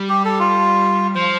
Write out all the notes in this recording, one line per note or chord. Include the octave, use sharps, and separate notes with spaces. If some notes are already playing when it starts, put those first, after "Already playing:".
Already playing: G3
G4
A4
F4
F3 C5